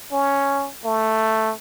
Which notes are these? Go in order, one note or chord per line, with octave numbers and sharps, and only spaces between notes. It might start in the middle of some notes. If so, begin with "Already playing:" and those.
C#4
A3